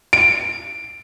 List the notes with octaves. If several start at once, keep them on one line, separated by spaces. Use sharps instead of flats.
D7